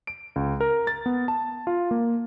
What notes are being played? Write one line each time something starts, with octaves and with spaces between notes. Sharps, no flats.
D7
C#2
A#4
A6
B3
A5
F4
A#3